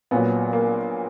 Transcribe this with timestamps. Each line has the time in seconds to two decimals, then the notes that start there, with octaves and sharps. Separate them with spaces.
0.11 A#1 A#2 F#3 B3
0.53 A#3